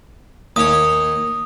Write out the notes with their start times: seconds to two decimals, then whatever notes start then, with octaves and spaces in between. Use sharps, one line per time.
0.56 D#2 C#5 D#6